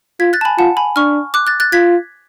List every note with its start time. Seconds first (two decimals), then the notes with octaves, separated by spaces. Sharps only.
0.20 F4 G#6 B6
0.33 F#6 A6
0.41 A5
0.45 G#5 B5
0.58 F4 F#5 A5
0.77 G#5 B5
0.96 D4 C#6 F6
1.34 D6 F#6
1.47 F#6 A6
1.60 F#6 A6
1.72 F4 G#6 B6